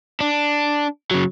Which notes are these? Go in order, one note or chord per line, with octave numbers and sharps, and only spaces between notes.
D4
C#3 F#3